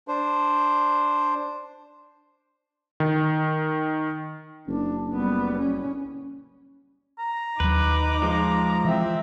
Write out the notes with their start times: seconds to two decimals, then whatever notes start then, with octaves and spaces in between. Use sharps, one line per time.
0.08 D4 C5
3.00 D#3
4.68 F#1 D4
5.14 G3 B3
5.58 C#4
7.19 A#5
7.60 D#2 F#3 D#4 B4 D6
8.22 F3 G#3
8.85 E3 C4 E5